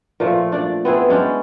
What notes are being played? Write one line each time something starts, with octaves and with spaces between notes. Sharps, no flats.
A#2 F3 A3
D4 D5
B3 C4 E4 G#4
G#3 C#4 D4 G5